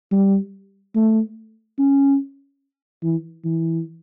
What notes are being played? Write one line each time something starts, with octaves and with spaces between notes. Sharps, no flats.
G3
A3
C#4
E3
E3